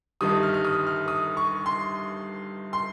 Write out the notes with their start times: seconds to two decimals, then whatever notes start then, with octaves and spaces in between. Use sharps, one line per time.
0.21 G1 G2 D#3 G3 D#6
0.43 F6
0.54 F6
0.65 D#6
0.87 F6
1.08 D#6
1.37 C#6
1.66 C6
2.73 C6